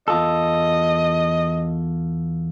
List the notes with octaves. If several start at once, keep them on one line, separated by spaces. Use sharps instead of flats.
E2 F4 A4 D#5